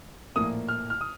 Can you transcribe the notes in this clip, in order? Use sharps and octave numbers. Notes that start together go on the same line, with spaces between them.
A#1 A2 F3 A#3 D#6
F6
F6
D#6